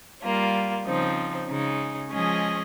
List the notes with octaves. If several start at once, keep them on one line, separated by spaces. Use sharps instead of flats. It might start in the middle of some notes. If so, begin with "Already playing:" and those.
G3 A#3 F4
C#3 F3 C4 D#4
C#3 G#3 D#4
F3 G#3 C#4 G#4 D#5